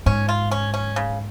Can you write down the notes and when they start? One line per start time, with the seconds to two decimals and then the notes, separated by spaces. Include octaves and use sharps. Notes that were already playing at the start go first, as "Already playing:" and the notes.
0.06 G#2 C#4
0.29 F4
0.51 C#4
0.74 C#4
0.96 C#3